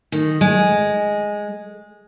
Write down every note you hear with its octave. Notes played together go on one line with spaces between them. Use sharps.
D#3
G#3